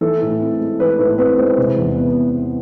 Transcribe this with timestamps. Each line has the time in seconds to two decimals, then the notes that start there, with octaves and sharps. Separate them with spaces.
0.01 E3 A4
0.21 A2
0.41 C4
0.61 G#3
0.80 E3 B4
0.99 A2 B4
1.18 C4 B4
1.37 G#3 C5
1.58 C3
1.77 E2
1.96 B3